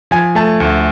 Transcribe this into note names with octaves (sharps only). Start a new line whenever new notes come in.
F3 G#5
A3 A5
D2